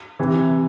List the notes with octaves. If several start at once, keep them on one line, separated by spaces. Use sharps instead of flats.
C3 E3